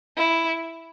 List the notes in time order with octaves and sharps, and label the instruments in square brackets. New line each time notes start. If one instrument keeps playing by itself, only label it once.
[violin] E4